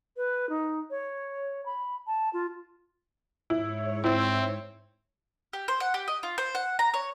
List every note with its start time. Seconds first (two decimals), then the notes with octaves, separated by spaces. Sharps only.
0.17 B4
0.49 D#4
0.90 C#5
1.66 B5
2.07 A5
2.33 F4
3.50 G#2 E4 C#5
4.04 C4 E4
5.53 G4
5.68 C5
5.80 F#5
5.94 G4
6.08 D#5
6.23 F4
6.38 C5
6.55 F#5
6.79 A#5
6.94 C#5